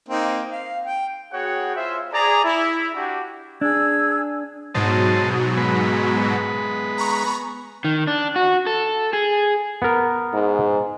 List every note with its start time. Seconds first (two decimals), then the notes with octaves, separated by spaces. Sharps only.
0.09 A#3 C4 D#4
0.51 F5
0.85 G5
1.32 B3 F#4 G#4 C#5 F#5 G5
1.75 E4 F4 C5 E5
2.12 G#4 D5 A#5
2.44 E4
2.95 D4 F#4 G4
3.61 D4 G#4 E6 G#6
4.75 G#2 B2 F#3 C5 D#5 A5
5.57 G#3 B3 B4
6.98 A#5 B5 C#6
7.84 D#3
8.07 D4
8.36 F#4
8.67 A4
9.13 G#4
9.82 B3 A#4
10.33 G#2